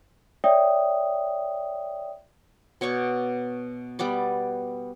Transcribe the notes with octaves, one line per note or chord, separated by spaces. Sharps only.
C#5 D5 E5 G5 D#6
B2 C#5 D5 C#6
G3 B3 D5 D6